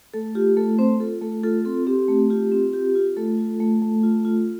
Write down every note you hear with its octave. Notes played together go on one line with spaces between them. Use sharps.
A3 A4
F4 G4
A3 A4
C4 C5
F4 A4
A3 A4
F4 A4
C4 A4
C4 G4
A3
F4 G4
C4
F4 G4
F4
A3 A4
F4
A3
A3
F4
F4